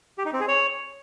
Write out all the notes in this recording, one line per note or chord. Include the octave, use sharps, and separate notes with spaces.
G4
D#4
C4
G#4
C#5